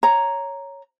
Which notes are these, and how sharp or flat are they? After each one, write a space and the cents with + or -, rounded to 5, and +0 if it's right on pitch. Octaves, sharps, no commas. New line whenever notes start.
C#5 +0 A#5 +0